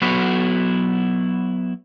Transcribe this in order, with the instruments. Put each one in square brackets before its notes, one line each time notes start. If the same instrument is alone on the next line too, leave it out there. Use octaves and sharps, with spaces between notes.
[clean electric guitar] F#3 B3 E4 F#4 B4 C#5